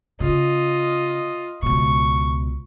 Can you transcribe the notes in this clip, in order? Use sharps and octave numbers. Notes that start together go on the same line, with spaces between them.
C#3 F4 D#5
C#2 B2 C#6